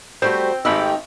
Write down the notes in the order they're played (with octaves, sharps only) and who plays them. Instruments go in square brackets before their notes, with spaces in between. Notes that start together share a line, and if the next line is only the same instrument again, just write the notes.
[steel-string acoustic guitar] G3 A3 F#4 [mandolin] C4 G5 [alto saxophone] C5
[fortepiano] G#1 B5 E6 [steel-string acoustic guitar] D#3 A3 G4 [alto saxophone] D#4